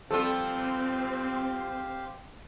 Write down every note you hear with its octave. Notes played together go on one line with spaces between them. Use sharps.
F3 G3 C4 F4 G4 A4 C5 F5